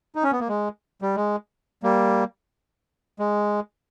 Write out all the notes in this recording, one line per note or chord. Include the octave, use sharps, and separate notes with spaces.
D#4
C#4
B3
A#3
G#3
G3
G#3
G3 A#3
G#3